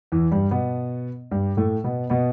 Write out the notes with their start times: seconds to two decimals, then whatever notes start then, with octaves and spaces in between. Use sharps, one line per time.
0.12 E2 E3
0.31 G2 G3
0.51 B2 B3
1.31 G2 G3
1.57 A2 A3
1.84 B2 B3
2.10 B2 B3